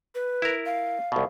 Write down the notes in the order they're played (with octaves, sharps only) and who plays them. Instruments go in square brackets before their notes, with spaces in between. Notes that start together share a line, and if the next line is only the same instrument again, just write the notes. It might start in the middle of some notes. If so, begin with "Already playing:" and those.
[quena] B4
[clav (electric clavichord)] E4 A#4
[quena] F5
[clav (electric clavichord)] C2 B2